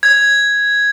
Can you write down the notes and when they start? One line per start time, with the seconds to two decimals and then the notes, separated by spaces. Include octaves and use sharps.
0.03 G#6